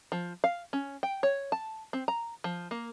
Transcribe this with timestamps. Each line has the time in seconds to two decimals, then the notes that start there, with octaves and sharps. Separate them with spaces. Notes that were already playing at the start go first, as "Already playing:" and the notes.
0.12 F3
0.44 F5
0.73 C#4
1.03 G5
1.23 C#5
1.52 A5
1.93 C4
2.08 A#5
2.44 F3
2.71 A#3